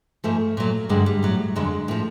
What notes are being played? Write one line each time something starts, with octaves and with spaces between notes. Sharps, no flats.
G#2 F3 A3
A#2 F#3
G2 D3 F#3 G#3
G3
A2 F#3
F2 D3 F#3 G#3
A2 F3